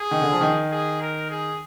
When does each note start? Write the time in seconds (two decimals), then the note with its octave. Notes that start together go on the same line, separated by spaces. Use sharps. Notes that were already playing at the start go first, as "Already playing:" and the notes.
Already playing: G#4
0.11 D#3
0.22 D3
0.32 F3
0.41 D#3
0.71 G#4
1.01 A#4
1.30 G#4